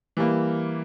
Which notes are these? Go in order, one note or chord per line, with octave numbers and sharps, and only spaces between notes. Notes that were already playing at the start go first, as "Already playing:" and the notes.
E3 G3 A#3